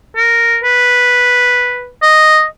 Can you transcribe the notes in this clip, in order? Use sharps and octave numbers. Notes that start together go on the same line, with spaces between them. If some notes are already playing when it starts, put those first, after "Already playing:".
A#4
B4
D#5